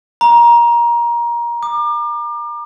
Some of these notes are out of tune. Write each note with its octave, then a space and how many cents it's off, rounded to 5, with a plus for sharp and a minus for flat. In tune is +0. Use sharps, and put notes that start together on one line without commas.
A#5 +20
D6 +35